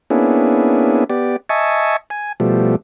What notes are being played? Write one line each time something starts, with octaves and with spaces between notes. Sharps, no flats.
A#3 B3 C#4 D4 E4 G#4
B3 G4 D5
D#5 E5 G#5 A5 C#6
G#5
B2 F3 G3 A3